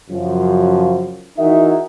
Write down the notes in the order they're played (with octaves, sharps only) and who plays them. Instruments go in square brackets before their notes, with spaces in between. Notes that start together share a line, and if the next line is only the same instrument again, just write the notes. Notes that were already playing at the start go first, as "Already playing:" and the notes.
[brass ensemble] F#2 C#3 F3
E3 D#4 F#4 G#4 A#4 E5